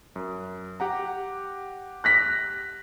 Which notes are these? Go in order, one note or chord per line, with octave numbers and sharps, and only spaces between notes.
F#2
G4 F#5 A#5
F#6 A#6 B6